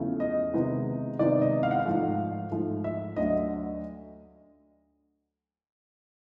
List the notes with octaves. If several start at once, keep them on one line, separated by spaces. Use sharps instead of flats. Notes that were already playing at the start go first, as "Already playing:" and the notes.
Already playing: E2 C#3 F3 A3
D#5
C3 D#3 G#3 B3 D#4
C3 D#3 G#3 B3 D#4 D5
D#5
F5
F#5
F5
G#2 F3 A3
G#2 F3 A3
E5
D2 D3 F#3 D#5